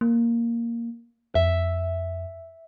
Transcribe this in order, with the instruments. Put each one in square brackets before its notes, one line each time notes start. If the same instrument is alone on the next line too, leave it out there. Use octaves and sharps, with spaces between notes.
[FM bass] A#3
[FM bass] F2 [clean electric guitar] E5